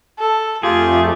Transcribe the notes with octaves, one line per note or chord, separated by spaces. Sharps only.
A4
F2 A3 F4 G4 G#4